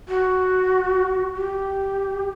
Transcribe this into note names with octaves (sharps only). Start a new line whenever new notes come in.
F#4
G4